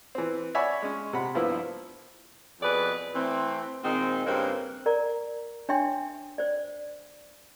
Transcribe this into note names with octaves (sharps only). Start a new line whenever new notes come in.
E3 C4
C#5 D5 E5 F#5 G#5 B5
G#3 C#4
C3 F#5 B5
G2 F3 A#3 B3 E4
F2 B2 G#4 B4 D5
E3 A3 C4
A#2 D#3 G#3 C4
G2 C#3 A#3 C4
A#4 D5 A#5
D4 C#5 E5 G5 G#5 C6
C5 D5